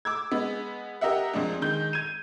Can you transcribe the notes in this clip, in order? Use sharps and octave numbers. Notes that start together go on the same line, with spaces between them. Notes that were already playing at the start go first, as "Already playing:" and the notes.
D6 E6 G#6
G#3 B3
G4 A#4 D#5 E5 F#5
F2 A#2 G#3 D4
D#3 G#3 G6
G#6 D#7